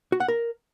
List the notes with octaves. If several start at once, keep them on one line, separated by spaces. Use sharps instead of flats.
F#4
F#5
A#4